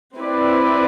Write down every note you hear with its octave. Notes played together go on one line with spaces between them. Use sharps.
C4 E4 B4 D5